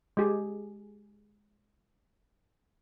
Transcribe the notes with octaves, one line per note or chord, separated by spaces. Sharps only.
G#3 G4 G#4